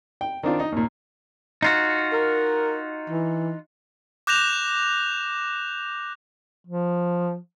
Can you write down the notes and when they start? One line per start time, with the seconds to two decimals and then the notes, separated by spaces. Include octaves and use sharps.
0.21 G5
0.43 D#3 C4 D4 F4
0.60 D#4
0.72 D#2 A#2
1.62 D#4 F4 F#4
2.12 A#4
3.10 E3
4.27 D6 F#6 G6 A#6 E7 F7
6.66 F3